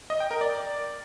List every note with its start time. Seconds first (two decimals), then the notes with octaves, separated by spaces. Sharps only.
0.10 D#5
0.20 G5
0.31 A#4
0.41 D5